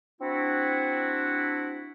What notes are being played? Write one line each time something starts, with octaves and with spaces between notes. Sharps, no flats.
C4 D4 E4 F#4